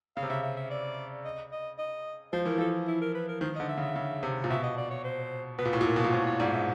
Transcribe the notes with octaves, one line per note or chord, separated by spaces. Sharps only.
C#3 F5
C3
C#3 E5
E5
E5
D5
D#5
D#5
D#5
F3 C5
E3 A#4
F3 A4
E4
A#4
B4
A#4
D#3 C5
D3 D#5
E5
C#3
E5
C#3
C3
A#2
B2 E5
D#5
D5
C#5
C5
B2 B4
A#2
A2
A#2
A#4
B2
A#2
A2 C5
C#5
G#2 D5
E5